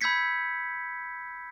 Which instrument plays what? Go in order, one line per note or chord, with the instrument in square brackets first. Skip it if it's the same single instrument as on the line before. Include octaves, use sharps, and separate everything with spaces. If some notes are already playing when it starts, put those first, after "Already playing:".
[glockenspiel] B5 E6 G6 G#6 B6 C#7